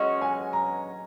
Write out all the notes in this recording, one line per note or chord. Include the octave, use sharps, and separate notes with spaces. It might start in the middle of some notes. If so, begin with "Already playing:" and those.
Already playing: G#3 C#4 F#4 D#5
G#5
A#5